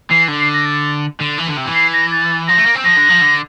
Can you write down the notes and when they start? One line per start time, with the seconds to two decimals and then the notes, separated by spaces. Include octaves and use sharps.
0.10 E3 C7
0.28 D3
0.40 C7
0.54 A#6
0.65 A6
1.20 D3
1.38 E3
1.47 D3
1.57 C3
1.66 E3
1.75 C7
1.93 A#6
2.11 A6
2.48 F3 A#6
2.58 A3
2.66 A#3
2.75 C4
2.84 F3 A#6
2.97 D3
3.09 F3
3.22 D3